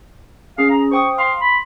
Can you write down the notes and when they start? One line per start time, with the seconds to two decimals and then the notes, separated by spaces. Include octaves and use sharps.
0.58 C#4 G#4 F5
0.70 A#5
0.91 C5 G5 C#6 D#6
1.18 F5 C6
1.41 B5